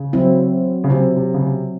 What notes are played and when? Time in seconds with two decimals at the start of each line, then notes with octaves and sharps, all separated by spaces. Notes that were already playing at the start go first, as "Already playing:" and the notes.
Already playing: C#3
0.13 F#3 C4 E4
0.84 C#3
0.90 C3 F#3 C4 E4
1.16 C3
1.34 C#3
1.41 C3